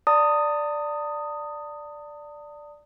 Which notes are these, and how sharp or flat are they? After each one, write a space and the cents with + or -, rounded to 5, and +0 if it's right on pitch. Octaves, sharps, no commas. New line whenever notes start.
D5 +0 A5 +45 D#6 +0